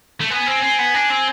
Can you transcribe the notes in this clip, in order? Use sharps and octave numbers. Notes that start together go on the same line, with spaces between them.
A3
B3 G#5
C4
C4
B3
D4
C4